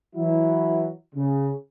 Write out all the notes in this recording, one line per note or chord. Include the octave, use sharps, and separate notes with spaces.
E3 F#3 E4
C#3